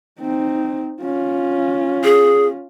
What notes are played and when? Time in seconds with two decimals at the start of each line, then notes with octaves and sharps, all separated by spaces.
0.20 C4 D#4
1.01 C#4 F4
2.04 G#4